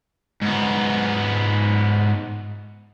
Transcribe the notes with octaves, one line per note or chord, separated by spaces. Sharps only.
G#2 B3